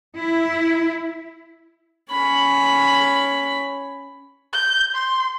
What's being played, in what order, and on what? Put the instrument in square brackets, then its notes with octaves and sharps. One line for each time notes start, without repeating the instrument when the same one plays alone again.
[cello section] E4
[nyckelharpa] C#4 B5
[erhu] G6
C6